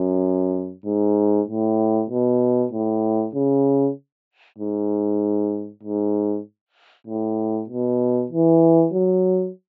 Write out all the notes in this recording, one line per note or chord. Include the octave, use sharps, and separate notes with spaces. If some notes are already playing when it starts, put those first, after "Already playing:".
Already playing: F#2
G#2
A2
B2
A2
C#3
G#2
G#2
A2
B2
E3
F#3